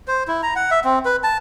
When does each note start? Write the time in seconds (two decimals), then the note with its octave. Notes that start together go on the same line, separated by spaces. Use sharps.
0.08 C5
0.28 E4
0.43 A#5
0.56 F#5
0.71 E5
0.84 C4
1.05 B4
1.24 A5